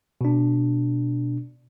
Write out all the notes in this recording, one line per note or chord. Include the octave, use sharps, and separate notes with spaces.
B2 D4